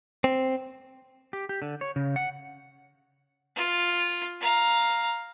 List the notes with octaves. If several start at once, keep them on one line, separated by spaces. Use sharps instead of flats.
C4
G4
G4
D3
C#5
C#3
F#5
F4
F5 A#5